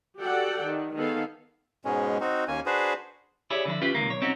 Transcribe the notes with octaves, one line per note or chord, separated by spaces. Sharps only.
F#4 G4 A4 D5 F#5 G5
D#3
D#3 B3 G#4 A4 F5
G#2 B2 G#3 C#4
C4 D#4 F#4
D#2 A#3 C#4 G#5
D4 F#4 G#4 B4 C5
E4 G4 G#4 C#5 D5
D3 F3 E4
C#4 E4 F4 G4 B4
C#2 C3 D#3 A#3
B1 C#5
C4 C#4 D#4 F#4